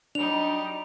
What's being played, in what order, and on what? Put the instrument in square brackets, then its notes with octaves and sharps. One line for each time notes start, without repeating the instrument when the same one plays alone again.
[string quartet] F#3 G3 D#4 [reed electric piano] D4 [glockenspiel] F7